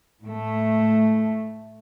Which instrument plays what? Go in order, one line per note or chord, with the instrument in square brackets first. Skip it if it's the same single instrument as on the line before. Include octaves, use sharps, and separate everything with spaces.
[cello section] A2 A3